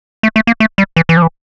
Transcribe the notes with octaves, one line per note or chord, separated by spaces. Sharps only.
A3
A3
A#3
A3
G3
E3
E3
F3
E3